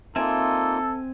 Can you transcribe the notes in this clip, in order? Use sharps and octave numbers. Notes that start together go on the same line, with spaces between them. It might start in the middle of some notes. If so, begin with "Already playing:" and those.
A#3 C4 D#4 F4 A4 E5 G#5